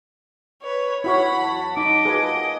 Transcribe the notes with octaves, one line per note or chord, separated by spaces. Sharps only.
B4 C#5
E4 F#4 C#5 F#5 B5
E2 F#3 A5
D#4 D#5 D6
A#3 F4 F#4 G#4 B4 G#5